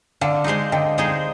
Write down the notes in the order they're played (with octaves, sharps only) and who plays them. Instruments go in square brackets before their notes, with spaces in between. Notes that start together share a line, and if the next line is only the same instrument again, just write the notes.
[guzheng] D3 [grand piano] D5 F5
[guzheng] G#3 D#4 G#4 C5
[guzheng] D3 [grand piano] D#5 G5
[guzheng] G#3 D#4 G#4 C5